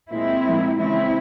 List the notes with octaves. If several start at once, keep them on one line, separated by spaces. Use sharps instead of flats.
A#2 G#3 C4 E4
A#2 F3 G#3
C#3 E3 G#3 C4 E4